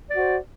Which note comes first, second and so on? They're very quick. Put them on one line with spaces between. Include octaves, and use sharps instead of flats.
D5 C5 F#4